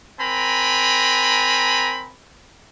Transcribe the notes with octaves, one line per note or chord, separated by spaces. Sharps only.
C4 A#4 G#5 A#5 B5